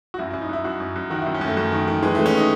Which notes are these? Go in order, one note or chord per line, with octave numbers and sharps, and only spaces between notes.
F#4
F#2 E4
F#2 E4
D#4
F#2 E4
F#2 F#4
F#2
F#2
D#3 F#4
F#2 E4
C#4
F#2 A3
F#2
D#3
D#3
E3 G#3
E3 A3
C#4
D#4